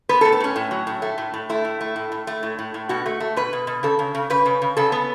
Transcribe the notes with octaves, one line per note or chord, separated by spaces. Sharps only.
B3 B4
A4
A2
A4
A2 C#4
A2
F#3
A2
A3
A2
A2
A3 E4
A2
A3
A2
A2
A3
A2
A2
A2
B2 F#4
A3
A3
B2 B4
B2
B2
C#3 A4
C#3
C#3
C#3 B4
C#3
C#3
C#3 A4
B3